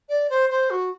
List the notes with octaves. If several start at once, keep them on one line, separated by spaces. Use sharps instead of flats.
D5
C5
C5
F#4